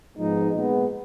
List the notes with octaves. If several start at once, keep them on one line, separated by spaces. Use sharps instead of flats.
G#2 F3 G#3 B3 D#4
A#2 G#3 B3